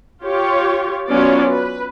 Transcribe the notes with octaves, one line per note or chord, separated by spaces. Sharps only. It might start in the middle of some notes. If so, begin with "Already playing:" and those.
F4 G4 C#5
F#3 B3 C#4 F4 C#5 D5
B4